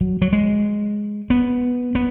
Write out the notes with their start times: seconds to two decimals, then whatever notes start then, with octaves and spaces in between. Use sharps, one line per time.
0.01 F#3
0.22 F#3
0.33 G#3
1.30 B3
1.95 B3